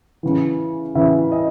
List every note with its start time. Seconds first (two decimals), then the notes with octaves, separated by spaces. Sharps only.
0.23 C#3 E3
0.95 C#3 E3 E5
1.32 D#5